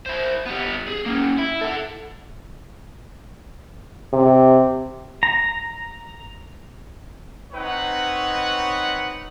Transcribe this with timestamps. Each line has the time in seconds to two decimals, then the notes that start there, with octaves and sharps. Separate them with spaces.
0.06 E4 C5
0.46 G3 B3
0.88 G#4
1.06 A#3 C#4
1.38 E4
1.61 A4 F#5
4.13 C3
5.23 A#5
7.52 C4 D#4 B4 C#5 F#5